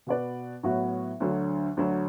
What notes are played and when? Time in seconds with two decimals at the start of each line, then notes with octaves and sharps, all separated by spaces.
0.07 B2 B3 F#4 B4 D5
0.63 A2 F#3 B3 F#4
1.20 D2 D3 F#3
1.77 D2 D3 F#3